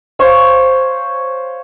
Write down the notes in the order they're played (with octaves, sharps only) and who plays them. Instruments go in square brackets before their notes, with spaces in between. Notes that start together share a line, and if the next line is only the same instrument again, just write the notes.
[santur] C5 C#5 F5 C#6